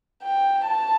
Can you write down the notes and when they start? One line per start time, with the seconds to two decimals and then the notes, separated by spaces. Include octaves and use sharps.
0.23 G5
0.67 A5